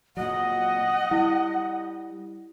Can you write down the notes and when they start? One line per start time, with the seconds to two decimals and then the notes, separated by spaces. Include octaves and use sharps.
0.17 A#2 F#3 D#5 F#5
1.11 G3 E4